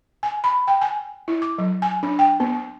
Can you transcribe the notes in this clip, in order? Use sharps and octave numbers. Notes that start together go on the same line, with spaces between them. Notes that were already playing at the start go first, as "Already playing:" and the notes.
G#5
B5
G5
G#5
E4
D6
F#3
G#5
D4
G5
B3